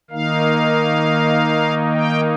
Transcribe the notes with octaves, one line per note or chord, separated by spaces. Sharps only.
D#3 A#3 D#4 F5
G5